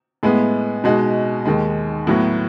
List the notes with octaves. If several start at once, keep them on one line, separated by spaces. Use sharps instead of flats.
A2 G#3 B3
B2 G#3 D#4 F#4
D#2 D#3 G#3
A2 F#3 B3 F#4